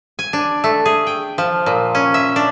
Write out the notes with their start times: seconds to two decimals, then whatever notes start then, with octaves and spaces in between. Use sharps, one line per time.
0.19 G#5
0.33 D4
0.64 A3
0.85 G#4
1.07 G5
1.38 F3
1.66 A#2
1.95 C#4
2.14 E5
2.36 D4